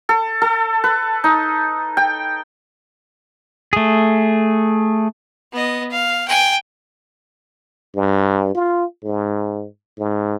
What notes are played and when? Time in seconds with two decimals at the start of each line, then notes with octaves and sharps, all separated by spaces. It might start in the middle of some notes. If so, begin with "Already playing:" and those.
0.09 A4
0.42 A4
0.84 B4
1.24 D#4
1.97 G5
3.73 A3 G#4
5.52 B3 D#5
5.90 F5
6.28 G5 G#5
7.95 G2
8.55 F4
9.04 G#2
9.98 G#2